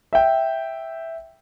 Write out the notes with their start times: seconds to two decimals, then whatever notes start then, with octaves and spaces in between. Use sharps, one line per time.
0.13 E5 G5